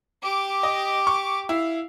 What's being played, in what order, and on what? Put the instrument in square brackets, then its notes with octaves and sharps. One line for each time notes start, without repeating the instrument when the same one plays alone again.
[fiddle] G4 D6
[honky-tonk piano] D#5
C#6
[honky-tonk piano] E4 [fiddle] F5